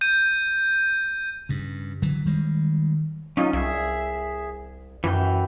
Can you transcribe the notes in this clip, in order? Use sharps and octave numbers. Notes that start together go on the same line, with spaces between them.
G6 D#7
G2 C#3
D3 E3 F#3
D#3 G3 G#3
F#3 C#4 D#4 F4
C2 G#4 E5
F#2 E3 F#4 G5